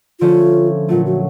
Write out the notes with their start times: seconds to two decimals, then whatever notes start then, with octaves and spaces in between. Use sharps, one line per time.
0.20 D3 F3 A3 C#4 F4
0.89 A#2 F#3 A3 F4
1.06 F#4